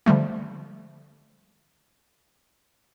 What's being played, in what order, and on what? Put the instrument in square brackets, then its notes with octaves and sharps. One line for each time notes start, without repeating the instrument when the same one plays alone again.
[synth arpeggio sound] D3 F3 G3 A3